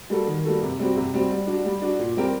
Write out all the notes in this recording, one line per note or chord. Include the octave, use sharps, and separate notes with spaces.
G3 A#3 F#4 A4
D#3
G3 A#3 F#4 A4
C3
G3 C4 F#4
C3
G3 C4 F#4
G3
D4 F#4
G3
D4 F#4
A#2
G3 C4 G4 A#4